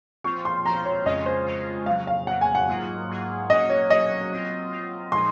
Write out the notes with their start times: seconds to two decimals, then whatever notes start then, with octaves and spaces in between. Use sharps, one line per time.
0.24 F3 C4 F4 C5 C#6
0.45 C6
0.65 F3 C4 F4 C5 A#5
0.85 C#5
1.05 F2 C#3 G#3 C#4 F4 D#5
1.26 C5
1.46 F2 C#3 G#3 C#4 F4
1.86 F2 C#3 F#3 F5
2.07 F5
2.27 F2 C#3 F#3 F#5
2.41 G#5
2.55 F#5
2.68 G#2 F#3 A#3 F4 G#4
3.08 G#2 F#3 A#3 F4 G#4
3.49 F#3 A#3 C#4 F#4 D#5
3.69 C#5
3.90 F#3 A#3 C#4 F#4 D#5
4.31 F#3 C4 F4
4.71 F#3 C4 F4
5.12 A#2 F3 G#3 D#4 G#4 C6